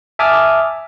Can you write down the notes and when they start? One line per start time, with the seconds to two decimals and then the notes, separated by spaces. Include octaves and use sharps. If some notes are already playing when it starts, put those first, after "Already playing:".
0.19 E5 G#5 A5 D6 D#6 F6